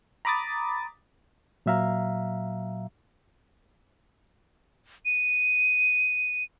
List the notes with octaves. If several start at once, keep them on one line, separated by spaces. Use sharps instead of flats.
A#5 B5 D6 D#6 A6
A#2 F#3 E5 F5 A#5
D#7